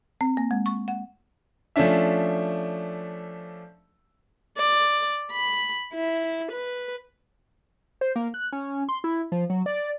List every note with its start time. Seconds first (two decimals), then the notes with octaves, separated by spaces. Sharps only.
0.21 C4
0.37 A#3
0.51 G#3
0.66 C#6
0.88 F#5
1.76 F3 A3 C#4 D4 E5
4.57 D5
5.32 B5
5.94 E4
6.52 B4
8.01 C5
8.16 A#3
8.34 F#6
8.53 C#4
8.89 C6
9.04 E4
9.32 F3
9.50 F#3
9.66 D5